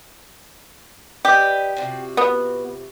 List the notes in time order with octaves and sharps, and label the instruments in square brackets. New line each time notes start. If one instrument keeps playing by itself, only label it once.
[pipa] G4 [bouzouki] B4 D5 D#5
[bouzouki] C3 F4 F#4
[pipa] B3